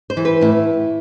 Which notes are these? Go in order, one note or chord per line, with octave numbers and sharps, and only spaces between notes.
C5
E3
B4
A2 E4